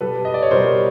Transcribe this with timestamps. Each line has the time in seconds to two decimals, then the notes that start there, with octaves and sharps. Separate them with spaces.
0.01 B2 G3 A4 B4
0.25 D#5
0.34 D5
0.43 C#5
0.51 B2 A#4 C5
0.54 G3